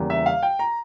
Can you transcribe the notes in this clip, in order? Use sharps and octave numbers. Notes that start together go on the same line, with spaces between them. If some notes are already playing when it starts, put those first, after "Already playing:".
Already playing: E2 C#3 G3 A#3
E5
F5
G5
A#5